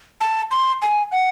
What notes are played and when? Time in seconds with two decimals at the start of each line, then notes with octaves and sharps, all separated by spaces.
0.21 A5
0.51 C6
0.82 G#5
1.12 F#5